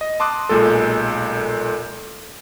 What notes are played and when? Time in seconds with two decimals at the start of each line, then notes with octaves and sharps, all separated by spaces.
0.01 D#5
0.20 A5 C6 D6 D#6 F#6
0.49 B1 A#2 G#3 A4